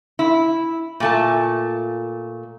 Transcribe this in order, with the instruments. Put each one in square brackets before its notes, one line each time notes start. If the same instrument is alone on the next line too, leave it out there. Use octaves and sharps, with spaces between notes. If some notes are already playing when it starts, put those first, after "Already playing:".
[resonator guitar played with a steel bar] E4
A#2 A3 A5